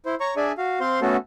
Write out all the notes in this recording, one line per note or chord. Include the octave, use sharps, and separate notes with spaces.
E4 C5
C#5 A#5 C#6
D4 G#4 D5 E5 G#5
F#4 F5
C4 C5 F5 C6
A3 B3 C#4 F#4 A4